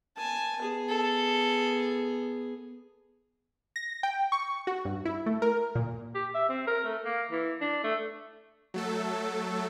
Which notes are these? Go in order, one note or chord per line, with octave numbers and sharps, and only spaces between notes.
G#5 A5
B3 G#4
A4
A#6
G5
C#6
F#4
G2
E4
A3
A#4
A#2
G4
E5
C4
A#4
A3
A#3
E3
D4
A3
F#3 A3 A4